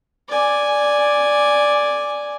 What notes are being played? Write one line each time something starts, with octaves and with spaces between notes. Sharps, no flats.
D5 G#5